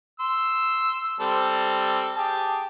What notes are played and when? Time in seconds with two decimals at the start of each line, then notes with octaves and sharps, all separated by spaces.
0.20 C6 E6
1.20 G3 C4 A4
2.16 G4 G#4 A5